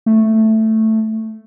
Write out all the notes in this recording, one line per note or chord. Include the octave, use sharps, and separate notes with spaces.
A3